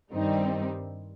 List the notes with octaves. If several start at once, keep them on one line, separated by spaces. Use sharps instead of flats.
G2 D#3 G3 C4 D#4